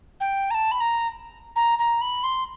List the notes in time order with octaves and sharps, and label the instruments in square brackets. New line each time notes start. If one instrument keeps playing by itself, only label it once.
[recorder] G5
A#5
A5
B5
A#5
A#5
A#5
B5
C6